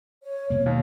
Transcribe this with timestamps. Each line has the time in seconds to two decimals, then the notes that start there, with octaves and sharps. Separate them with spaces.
0.24 C#5
0.50 B2 A#3
0.66 D#2